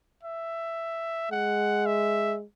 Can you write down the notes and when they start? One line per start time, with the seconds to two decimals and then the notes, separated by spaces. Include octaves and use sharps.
0.23 E5
1.31 G#3 F#5
1.86 E5